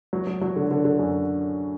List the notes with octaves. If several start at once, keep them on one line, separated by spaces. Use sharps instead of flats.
F#3
F#3
F#3
D3
D3
D3
F#2